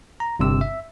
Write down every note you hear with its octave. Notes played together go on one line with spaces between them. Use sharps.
A#5
G1 G2 C3 E6
E5